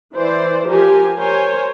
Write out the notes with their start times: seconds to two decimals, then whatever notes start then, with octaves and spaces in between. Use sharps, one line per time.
0.14 E3 C5 D5
0.67 F3 G4 A#4 G#5
1.17 A#4 C5 C#5 G#5